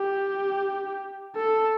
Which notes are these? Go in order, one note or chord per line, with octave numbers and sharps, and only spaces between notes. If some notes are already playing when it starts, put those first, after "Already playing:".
Already playing: G4
A4